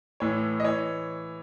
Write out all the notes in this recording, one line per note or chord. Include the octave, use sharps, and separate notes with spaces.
A2 E3 C#5
D#5
E3 C#5